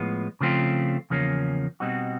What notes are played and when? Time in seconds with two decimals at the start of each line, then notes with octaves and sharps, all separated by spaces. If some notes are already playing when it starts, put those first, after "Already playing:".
Already playing: A2 F3 G#3 B3
0.41 C#3 F3 A3 C4 F4
1.10 E2 C#3 F3 A#3 C#4
1.80 B2 G3 C4 D#4 F#4